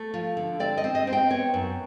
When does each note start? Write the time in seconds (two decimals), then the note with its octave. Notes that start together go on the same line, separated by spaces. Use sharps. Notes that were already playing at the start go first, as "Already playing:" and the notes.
Already playing: A3
0.14 F3
0.37 D3
0.60 C4 D5
0.78 D#5
0.84 C4
0.95 D#5
1.07 C4
1.13 G5
1.30 B3 C#5
1.54 F#2